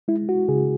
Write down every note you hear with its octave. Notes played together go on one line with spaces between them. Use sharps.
G#3 E4
F#4
C#3 G#4